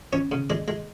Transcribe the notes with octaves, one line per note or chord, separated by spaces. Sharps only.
C#4 C#5
C#3
G#3 D5
G#3